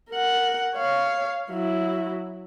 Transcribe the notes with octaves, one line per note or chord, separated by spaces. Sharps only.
A#4 F#5
C#5 F5
F#3 E4